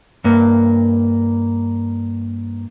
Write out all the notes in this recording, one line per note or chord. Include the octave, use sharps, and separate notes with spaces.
G2 A#3